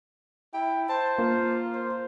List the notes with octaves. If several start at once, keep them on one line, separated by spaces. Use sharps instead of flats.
E4 G5
C5 A5
A#3 F4
C5